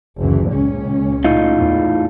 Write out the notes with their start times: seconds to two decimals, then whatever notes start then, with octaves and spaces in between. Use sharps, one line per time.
0.18 F#1 D2 E3
0.50 C#2 A#2 C#4
1.24 A2 D#4 F4
1.56 E2